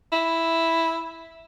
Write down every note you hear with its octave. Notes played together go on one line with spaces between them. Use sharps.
E4